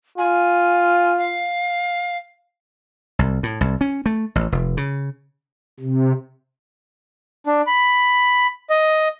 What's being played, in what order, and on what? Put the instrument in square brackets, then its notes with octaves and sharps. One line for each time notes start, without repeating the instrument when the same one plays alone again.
[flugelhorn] F4 [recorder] G#5
[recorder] F5
[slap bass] C2
A2
C2
C#4
A3
A1
F1
C#3
[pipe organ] C3
[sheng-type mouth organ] D4
B5
D#5